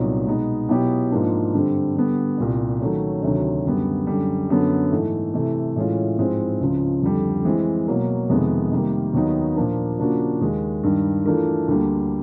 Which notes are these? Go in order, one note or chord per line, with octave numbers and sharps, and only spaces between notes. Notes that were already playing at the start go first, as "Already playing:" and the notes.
Already playing: C2 A#2 F#3 B3 D#4
B2 G#3 B3 D#4
B2 F#3 B3 E4 G4
G#2 F3 A#3 D4
G2 D3 G3 C4
D3 G3 B3
C2 A#2 G3
D#3 F#3 A3 C#4
D2 C3 D#3 F#3
F#2 D3 G3 B3
F#2 D3 G3
F#2 D3 F#3 B3
G#2 E3 A3
C3 E3 A3
A2 E3 G#3 C#4 F4
G#2 F3 G#3 C4 E4
C#2 C#3 F3
F2 D3 G3
E3 G#3 C4
B2 F#3 A#3
F2 C3 D#3 G#3 B3
C3 D#3 G3 A#3
D#2 D#3 F#3 B3 D#4
A#2 F3 A#3 D4
C#3 F3 A#3 D4 F#4
D#2 D#3 G#3
G2 D#3 G3
E3 A3 D4 F4 A#4
D2 D3 G3 A#3